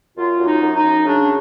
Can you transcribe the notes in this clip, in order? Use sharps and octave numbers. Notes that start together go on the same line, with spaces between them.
F#2 F4
F#2
D#4
F#2
D#4
F#2
C#3 D4